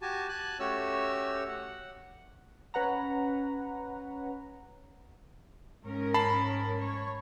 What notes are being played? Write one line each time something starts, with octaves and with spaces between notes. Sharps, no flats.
F#4 G4 G#5 A5
G#5 A5 F#6
A3 C#4 F#4 G4 C#5 E6
F#5
C#4 B4 F#5 A#5
G#2 C#4 A#4
A5 B5 C7
C#5